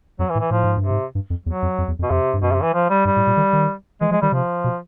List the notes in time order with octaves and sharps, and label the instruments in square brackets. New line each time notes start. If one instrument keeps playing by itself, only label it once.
[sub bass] F2 [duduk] F#3
[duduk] E3
[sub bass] A2
[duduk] E3
[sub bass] A2 [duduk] F3
[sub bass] G#2
G2
[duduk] C3
[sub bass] G#2
G2
F2
[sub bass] E2 [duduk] F#3
[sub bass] F2
F2
E2
F2
[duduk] B2
[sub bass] F2 [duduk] C3
[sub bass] G2
[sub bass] F#2 [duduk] B2
[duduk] C3
E3
F3
G3
[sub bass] G2 [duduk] G3
[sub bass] A2
A#2
D#3
D#3
[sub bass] E3 [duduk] G#3
[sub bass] F3 [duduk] G#3
[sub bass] D#3 [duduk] G3
[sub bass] C3 [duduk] F3
[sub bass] B2